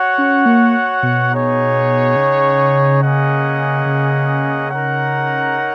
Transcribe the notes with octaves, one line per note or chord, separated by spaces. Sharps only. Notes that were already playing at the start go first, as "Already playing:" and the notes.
Already playing: F#4 C#5 F#5
C#4
A#3
B2
D#4 G#4 C#5 F#5
C#3
A#3 C#4 G#4 D#5 F#5
C#3
D#4 A#4 C#5 F#5